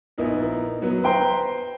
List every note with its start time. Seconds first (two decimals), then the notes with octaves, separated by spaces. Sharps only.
0.18 A#1 B3 D#4 E4 A#4
0.82 F#3 B3
1.03 B4 C5 G5 A#5 C6